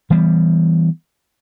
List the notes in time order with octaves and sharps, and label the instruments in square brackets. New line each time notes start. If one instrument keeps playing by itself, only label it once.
[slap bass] E3 G3 B3